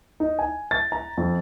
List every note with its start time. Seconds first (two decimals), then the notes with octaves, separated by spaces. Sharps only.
0.20 D#4
0.39 G#5
0.71 A6
0.92 A#5
1.17 F2